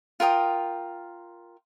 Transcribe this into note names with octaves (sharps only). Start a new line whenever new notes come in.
F4 A#4 G5 D#6